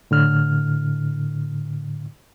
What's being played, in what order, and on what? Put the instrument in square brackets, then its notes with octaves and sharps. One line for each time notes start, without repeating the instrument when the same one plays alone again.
[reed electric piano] A2 D3 F6